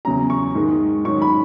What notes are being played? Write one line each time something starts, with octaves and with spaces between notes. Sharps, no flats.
E2 C#3 F#3 C#4 A#5
C#6
G#2 D#3 G#3
G#2 D#3 F#3 C#4 C#6
B5